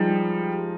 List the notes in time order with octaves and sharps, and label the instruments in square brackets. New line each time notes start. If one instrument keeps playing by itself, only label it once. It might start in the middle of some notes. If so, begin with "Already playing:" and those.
Already playing: [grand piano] F3 G#3 D#4 [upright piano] G3